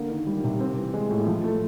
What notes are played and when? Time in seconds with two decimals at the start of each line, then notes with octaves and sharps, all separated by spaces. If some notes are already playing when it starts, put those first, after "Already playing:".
Already playing: D3 A#3
0.10 D#3
0.27 G3
0.44 C3
0.60 C4
0.77 E3
0.94 G#3
1.10 A2
1.27 F3
1.44 A3